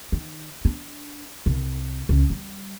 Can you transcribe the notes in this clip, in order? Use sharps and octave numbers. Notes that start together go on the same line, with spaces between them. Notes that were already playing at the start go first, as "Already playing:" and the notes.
D#3
D4
C2
C#2
G3